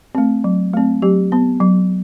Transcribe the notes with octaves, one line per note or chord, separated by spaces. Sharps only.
A3 C4
F#3
A3 C4
F#3 G4
B3
F#3